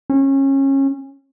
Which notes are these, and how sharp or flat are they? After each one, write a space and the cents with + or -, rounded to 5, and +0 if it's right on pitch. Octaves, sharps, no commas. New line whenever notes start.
C#4 -25